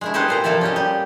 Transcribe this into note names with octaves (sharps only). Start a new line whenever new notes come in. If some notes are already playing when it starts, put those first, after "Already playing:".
G#3 A3 E4
E4 G4 A4 B4 C5 D#5
A#2 C5 A#5
C3 F3 A#3 E4 A4 D5
C#4 G4 D#5
G3 G4